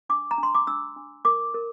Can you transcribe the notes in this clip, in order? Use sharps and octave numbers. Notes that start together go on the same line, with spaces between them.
D4 D6
A#5
D4
C6
D6
D4 E6
D4
A#4 D6
A#4